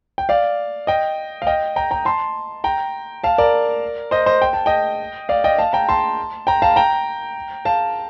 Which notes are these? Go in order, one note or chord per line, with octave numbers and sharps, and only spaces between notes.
G5
D5 F5
D#5 G5
F5
D#5 G5
G5 A#5
G5 A#5
A5 C6
G5 A#5
F5 A5
A#4 D5
C5 D#5
C5 D#5
G5
A5
D#5 G5
D5 F5
D#5 G5
F5 A5
G5 A#5
A5 C6
G5 A#5
F5 A5
G5 A#5
F5 A5